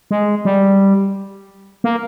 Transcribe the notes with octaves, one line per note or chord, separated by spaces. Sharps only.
G#3
G3
A#3